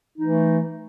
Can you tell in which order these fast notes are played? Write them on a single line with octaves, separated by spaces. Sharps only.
D#4 E3 A3